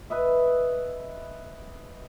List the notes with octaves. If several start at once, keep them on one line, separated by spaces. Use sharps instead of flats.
B4 D#5 E5